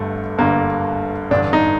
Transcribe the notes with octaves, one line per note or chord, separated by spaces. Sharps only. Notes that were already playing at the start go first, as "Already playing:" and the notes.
Already playing: G1 G2 D3 A3
G1 G2 D3 A#3
A1 G2 D3 D4
D#4